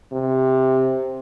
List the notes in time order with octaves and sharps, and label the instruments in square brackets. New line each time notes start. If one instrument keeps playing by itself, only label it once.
[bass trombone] C3